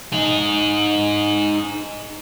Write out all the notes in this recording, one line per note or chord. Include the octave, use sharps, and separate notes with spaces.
D#4 G#4